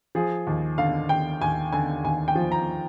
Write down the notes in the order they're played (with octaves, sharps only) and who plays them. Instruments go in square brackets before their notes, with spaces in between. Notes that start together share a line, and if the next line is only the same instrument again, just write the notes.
[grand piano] F3 G#4
D#2
D3 F5
D#2 G5
D#2 G#5
D3 G#5
D#2 G#5
G5
F3
A#5